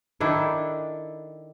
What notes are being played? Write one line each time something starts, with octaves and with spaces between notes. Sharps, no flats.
D#3 D4 E4 A4